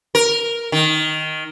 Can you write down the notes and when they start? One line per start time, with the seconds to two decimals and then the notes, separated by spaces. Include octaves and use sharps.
0.15 A#4
0.72 D#3